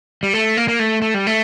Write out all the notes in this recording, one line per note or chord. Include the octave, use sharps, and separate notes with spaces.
G3
A3
A#3
A#3
A3
A3
G3
A3